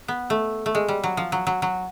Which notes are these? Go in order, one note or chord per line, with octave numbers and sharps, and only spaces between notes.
B3
A3
A3
G#3
G3
F#3
F3
F#3
F#3
F#3